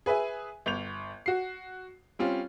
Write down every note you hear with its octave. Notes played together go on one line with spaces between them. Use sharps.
G#4 B4 E5 G#5
G1 G6 F7
F#4 C7
G3 C4 C#4 F4